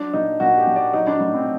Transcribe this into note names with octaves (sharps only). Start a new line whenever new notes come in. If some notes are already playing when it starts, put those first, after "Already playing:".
Already playing: F#3 D4
A#2 D#4
A#2 F#4
G4
A#2
D5
F#3 D#4
D4
A2 D4
C4